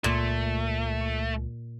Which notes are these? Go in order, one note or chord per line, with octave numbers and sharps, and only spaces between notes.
C#2 A#2 A3